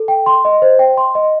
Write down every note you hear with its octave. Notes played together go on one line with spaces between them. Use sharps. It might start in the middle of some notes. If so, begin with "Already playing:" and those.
Already playing: A4
G5
C6
D#5
C5
G5
C6
D#5